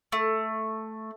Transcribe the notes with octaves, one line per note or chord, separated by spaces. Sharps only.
A3